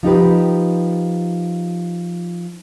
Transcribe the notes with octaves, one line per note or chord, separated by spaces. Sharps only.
F3 D#4 G4 B4